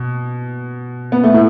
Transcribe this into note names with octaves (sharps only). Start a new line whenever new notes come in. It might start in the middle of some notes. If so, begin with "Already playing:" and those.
Already playing: B2
B3
A3
A2